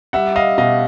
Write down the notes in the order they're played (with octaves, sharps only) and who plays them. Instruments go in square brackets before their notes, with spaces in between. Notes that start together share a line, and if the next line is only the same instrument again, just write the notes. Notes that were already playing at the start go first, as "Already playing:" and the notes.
[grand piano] G3 E5 F#5
D#5 F5
B2 D#5 F5